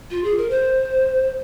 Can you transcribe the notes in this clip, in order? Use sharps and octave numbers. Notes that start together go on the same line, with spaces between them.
F4
G#4
A#4
C5